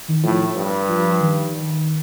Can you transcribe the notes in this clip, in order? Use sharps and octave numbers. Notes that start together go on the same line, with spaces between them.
D#3
A2 F3
G2
F3
D#3